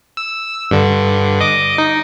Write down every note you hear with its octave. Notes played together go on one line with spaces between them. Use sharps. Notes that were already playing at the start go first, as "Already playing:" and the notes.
E6
G2 D3
D#5 D6
D#4